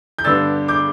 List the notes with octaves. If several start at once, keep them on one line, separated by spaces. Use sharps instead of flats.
G6
G2 D3 B3 D4 E6 A6
D6 G6